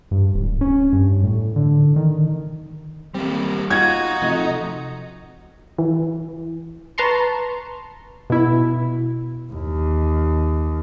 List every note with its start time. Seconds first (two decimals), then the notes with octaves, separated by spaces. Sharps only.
0.11 G2
0.34 D1
0.61 C#4
0.92 G2
1.23 A2
1.56 D3
1.96 D#3
3.14 G3 A#3 C4
3.70 D#4 F4 F#4 G#6
4.22 C3 F3 A3
5.78 E3
6.98 B4 A5 A#5 C6 C#6
8.30 B2 E4
9.53 D#2